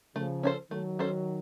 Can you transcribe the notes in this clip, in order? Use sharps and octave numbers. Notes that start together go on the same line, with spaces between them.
C#3 F3 A3
C#4 A4 C5
D#3 F#3 A3
C#4 A4 C5